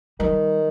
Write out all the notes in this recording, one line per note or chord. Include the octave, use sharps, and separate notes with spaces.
D#3 G3